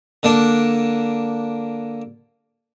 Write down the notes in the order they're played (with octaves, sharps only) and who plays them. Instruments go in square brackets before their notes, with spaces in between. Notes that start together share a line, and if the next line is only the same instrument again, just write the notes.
[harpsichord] D3 A#3 D4